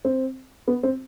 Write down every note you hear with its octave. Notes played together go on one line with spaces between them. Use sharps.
C4
B3
C4